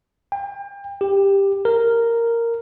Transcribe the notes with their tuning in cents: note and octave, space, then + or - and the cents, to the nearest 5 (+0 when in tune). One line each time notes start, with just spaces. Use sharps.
G5 +35
G4 +10
A#4 -5